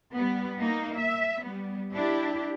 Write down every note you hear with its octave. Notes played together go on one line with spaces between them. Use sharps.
G3 B3
A#3 D#4
E5
G3 B3
D4 E4 G4